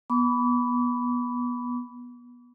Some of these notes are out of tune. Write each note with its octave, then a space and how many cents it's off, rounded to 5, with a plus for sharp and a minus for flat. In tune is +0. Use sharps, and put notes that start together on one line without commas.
B3 -20 B5 +0 D6 -40